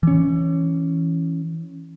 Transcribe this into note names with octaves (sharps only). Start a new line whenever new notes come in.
E3 C#4